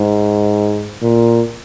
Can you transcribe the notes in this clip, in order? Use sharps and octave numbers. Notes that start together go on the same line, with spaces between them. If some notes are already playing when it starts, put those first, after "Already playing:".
Already playing: G#2
A#2